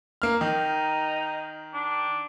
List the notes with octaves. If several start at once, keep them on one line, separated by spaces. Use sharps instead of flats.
A#3 F6
D#3 D#4
D4